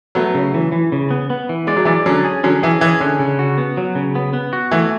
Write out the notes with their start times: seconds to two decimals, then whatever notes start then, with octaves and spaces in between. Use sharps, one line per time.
0.15 F#3 A3 B3
0.35 C#3
0.54 E3
0.72 E3
0.92 C#3
1.11 B3
1.30 B3
1.49 E3
1.67 G#3 D5
1.77 F#3
1.85 E3 G#3 D5
2.06 D3 F#3 C#4
2.24 G#4
2.44 D3 F#3 C#4
2.63 E3 G#4
2.81 E3 G#4
3.00 D3 C#4
3.20 C#3
3.39 F#4
3.58 B3
3.77 F#3
3.95 C#3
4.15 B3
4.33 B3
4.53 F#4
4.71 E3 A3